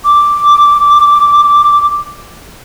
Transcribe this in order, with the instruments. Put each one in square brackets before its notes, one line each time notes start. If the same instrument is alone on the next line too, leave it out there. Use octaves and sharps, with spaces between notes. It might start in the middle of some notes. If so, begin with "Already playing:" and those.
[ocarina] D6